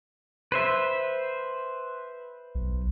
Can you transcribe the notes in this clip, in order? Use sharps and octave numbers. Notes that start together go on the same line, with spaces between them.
B4 C5 E5
B1